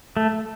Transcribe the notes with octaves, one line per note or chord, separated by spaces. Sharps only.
A3